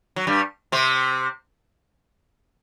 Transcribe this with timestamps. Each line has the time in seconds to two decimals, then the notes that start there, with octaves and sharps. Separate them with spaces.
0.16 F#3
0.27 G2 G3
0.72 C3 C4